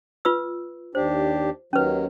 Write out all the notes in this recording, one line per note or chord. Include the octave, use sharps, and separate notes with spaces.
F4 B4 E6
D#2 D4 G4 C5
D#2 D#3 F#3 C#4 B4